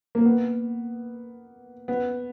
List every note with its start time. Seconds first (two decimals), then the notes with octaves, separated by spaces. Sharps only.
0.15 A#3
0.25 B3
1.88 B3